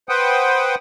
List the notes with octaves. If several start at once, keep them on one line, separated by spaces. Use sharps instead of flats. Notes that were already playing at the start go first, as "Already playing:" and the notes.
B4 C5 F#5 G5 D#6